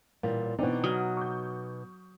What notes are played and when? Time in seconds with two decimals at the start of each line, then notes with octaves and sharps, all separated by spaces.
0.23 A1 A#2 G3
0.59 B2 E3 C4 D4 D#4
0.84 F#3 D#6 F6
1.17 C#6 D6 G6